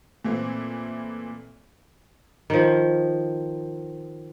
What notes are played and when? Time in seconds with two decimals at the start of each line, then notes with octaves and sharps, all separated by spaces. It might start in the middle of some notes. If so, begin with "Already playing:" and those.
0.25 A#2 E3 A3 C4
2.50 D#3 F3